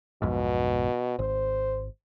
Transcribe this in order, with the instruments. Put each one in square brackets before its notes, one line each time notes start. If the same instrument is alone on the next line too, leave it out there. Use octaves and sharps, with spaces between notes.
[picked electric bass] B1 F2 G#2 [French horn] B2
[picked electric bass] G#1 [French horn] C5